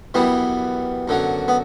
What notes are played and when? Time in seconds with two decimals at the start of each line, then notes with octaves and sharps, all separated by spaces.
0.14 F#2 E3 G3 B3
1.08 F#2 D3 F#3
1.48 B3